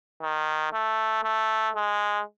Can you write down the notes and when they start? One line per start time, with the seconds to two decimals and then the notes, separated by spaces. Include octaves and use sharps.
0.22 D#3
0.73 A3
1.23 A3
1.75 G#3